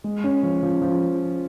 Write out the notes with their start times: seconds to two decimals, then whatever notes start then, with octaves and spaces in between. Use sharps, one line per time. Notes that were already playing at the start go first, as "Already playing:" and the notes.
0.04 G#3
0.24 C#4
0.43 F3
0.63 F3
0.82 F3